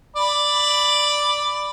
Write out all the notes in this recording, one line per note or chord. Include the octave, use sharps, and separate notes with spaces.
D5 B5